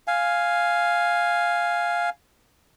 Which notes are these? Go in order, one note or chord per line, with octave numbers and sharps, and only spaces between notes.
F5 G#5